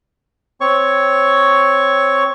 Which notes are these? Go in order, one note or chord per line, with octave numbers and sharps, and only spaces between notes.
C4 C#5 C#6